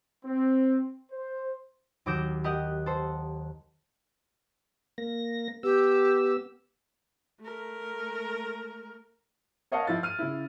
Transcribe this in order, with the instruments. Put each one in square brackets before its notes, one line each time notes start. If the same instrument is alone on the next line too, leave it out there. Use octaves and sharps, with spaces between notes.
[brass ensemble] C4
C5
[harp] D#2 F#3 D6 G6 A#6 E7
G4 A#4 D#5 F#5
A4 C5
[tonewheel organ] A#3 A#6
[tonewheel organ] B3 E6 [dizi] G4
[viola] A3 A#4
[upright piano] A#4 C#5 D#5 F5 F#5 A5
F3 E4 A6
F6 D#7
C#3 E4